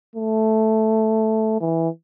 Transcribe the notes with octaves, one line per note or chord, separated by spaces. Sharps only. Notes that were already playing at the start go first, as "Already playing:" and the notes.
A3
E3